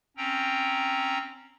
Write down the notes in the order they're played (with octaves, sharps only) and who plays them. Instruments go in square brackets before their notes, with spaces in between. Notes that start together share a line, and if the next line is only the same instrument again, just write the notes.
[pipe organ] C4 C#4 G5 A#5